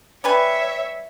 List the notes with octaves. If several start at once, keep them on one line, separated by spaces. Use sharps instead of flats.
G3 B4 C#5 E5 G#5